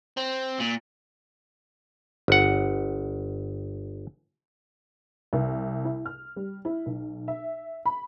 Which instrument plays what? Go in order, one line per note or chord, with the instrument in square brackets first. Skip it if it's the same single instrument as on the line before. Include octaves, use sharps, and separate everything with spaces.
[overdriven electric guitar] C4
A#2
[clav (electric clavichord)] G1 F#5
[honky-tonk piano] C2
E4
F6
G3
E4
B1
E5
B5